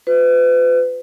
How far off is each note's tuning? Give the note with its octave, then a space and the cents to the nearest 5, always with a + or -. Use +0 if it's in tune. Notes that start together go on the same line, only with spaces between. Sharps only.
F4 +40 B4 +35